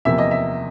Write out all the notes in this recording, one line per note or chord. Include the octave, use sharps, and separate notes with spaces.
E2 C3 F3 A#3 E5
D#5
E5